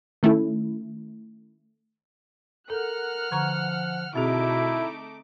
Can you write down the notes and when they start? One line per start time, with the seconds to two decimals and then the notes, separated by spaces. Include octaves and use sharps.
0.23 D#3 A3 C#4 E4
2.70 A4 A#4 F#5 F6 F#6
3.32 D3 F3 A#5 C#6
4.16 B2 A3 C4 D#4 E4 G#4 D6